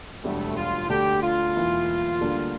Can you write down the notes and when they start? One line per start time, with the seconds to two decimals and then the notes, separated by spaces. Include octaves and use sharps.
0.24 E1 D2 D3 G3 A3
0.57 F4
0.89 D2 D3 A3 D4 G4
1.23 F4
1.55 E1 E2 E3 A#3 E4
2.21 D2 D3 G3 A#3 D4